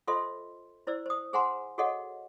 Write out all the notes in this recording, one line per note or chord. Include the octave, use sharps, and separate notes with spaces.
F4 A4 C5 D#5 E5 C6
E4 C5 D5 E6
C5 D#6
G#4 C5 F#5 G#5 A#5 C6
F#4 G#4 A4 C#5 D#5 F#5